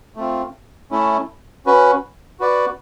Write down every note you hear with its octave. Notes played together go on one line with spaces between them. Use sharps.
A3 C4 F4
A3 C#4 E4
C#4 F#4 B4
F#4 B4 D5